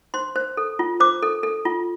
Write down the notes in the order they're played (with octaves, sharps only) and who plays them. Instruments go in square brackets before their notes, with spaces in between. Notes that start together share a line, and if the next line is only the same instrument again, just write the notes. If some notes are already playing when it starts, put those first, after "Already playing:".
[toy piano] C5 C6
C5
A4
F4
C5 D6
A4
A4
F4